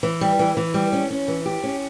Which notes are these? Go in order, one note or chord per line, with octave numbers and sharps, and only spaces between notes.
E3
G3
E3
E3
G3
C#4
C#4
E3
G4
C#4